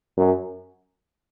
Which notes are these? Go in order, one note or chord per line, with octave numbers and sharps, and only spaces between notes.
F#2